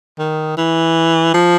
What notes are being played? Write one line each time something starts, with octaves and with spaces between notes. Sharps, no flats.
D#3
E3
F3